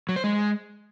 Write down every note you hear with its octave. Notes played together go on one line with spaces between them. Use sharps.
F#3
C5
G#3